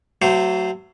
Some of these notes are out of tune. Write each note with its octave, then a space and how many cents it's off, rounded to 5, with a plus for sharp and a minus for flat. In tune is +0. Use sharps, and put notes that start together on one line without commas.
F#3 +20 A3 +40 C5 -10